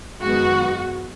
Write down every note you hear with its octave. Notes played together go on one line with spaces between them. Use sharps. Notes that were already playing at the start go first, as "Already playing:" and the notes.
F#2 D#3 G#3 B3 F#4